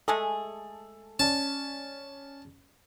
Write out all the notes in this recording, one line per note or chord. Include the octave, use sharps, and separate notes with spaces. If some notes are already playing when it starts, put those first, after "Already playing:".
G#3 A3 G#4 A4
C#4 D5 A5